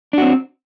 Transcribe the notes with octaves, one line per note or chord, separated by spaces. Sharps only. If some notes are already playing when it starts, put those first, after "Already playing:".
C4 D4 F#4